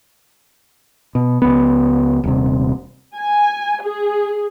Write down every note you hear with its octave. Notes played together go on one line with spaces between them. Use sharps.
B2
C#2 B3
D#1 C3
G#5
G#4